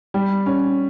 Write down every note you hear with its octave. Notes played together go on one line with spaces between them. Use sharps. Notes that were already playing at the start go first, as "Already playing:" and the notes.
G3
C#4